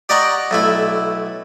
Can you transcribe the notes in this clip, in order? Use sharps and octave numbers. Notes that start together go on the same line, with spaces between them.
G4 D5 D#5 F#5 A#5 C#6
B1 A3 E4